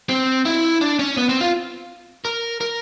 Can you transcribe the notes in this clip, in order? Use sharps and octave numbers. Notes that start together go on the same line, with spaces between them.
C4
E4
D4
C#4
B3
C4
F4
A#4
A#4